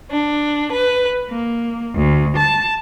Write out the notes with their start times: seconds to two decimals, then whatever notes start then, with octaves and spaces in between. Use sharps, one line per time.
0.11 D4
0.71 B4
1.29 A#3
1.95 D2
2.36 A5